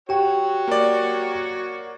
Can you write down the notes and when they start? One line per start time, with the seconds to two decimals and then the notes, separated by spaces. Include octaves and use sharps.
0.09 F#4 G4 C#5 G5
0.68 A#3 D5